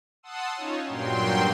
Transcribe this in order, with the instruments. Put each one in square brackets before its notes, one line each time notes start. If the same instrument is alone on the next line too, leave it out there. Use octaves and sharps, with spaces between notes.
[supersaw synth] F#5 A5 C6 D#6 E6
C#4 D#4 F4 C#5
G2 A#2 F#3 G5 C6